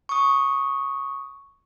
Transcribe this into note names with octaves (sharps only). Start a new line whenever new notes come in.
C#6 D#6